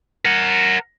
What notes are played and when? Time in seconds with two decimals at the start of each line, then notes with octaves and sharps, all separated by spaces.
0.25 A#4 F#5